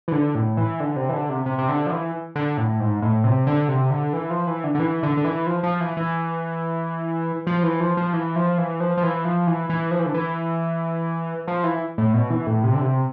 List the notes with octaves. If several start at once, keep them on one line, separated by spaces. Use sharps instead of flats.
E3
D3
A2
E3
D3
C3
E3
D3
C3
C3
C3
D3
F3
E3
D3
A2
G#2
A2
C3
D3
C3
D3
E3
F3
E3
D3
D3
E3
D3
D3
E3
F3
F3
E3
E3
F3
E3
F3
F3
E3
F3
E3
F3
F3
E3
F3
E3
E3
F3
E3
D3
E3
F3
E3
A2
B2
E3
A2
C3
D3
C3